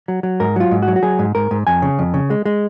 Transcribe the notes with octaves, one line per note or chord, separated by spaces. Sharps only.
F#3
F#3
G#2 A#4
F#3 F4
G#2
F#4
F#3
F#4
F#3 G#4
G#2
G#2 A#4
G#2
F2 G#5
C#3
F2
C#3
G#3
G#3